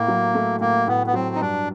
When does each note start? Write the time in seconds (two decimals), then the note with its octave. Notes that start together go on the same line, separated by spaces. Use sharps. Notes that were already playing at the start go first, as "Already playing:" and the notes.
Already playing: A2 A#3
0.08 F#3
0.35 A3
0.60 A2 A#3
0.87 A2 B3
1.07 B3
1.14 F#3 C4
1.35 D#4
1.41 G2 D4